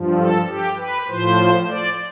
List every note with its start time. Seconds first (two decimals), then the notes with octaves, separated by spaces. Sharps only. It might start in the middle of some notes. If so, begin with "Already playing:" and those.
Already playing: G2 F3
0.17 A4
0.48 G4
0.77 B4
1.08 A2 F3 C5
1.68 D5